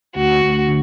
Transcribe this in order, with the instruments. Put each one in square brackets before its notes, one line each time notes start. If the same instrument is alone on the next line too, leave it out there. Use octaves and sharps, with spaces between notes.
[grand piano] D2 [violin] F#4
[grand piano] D2
D3